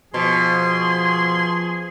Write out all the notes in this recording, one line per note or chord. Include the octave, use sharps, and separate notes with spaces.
B2 F3 G#4 C6